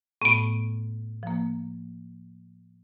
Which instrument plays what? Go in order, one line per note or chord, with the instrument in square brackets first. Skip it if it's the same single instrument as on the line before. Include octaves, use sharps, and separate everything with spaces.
[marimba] A2 A3 B3 [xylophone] D7 D#7
[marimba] F3 A#3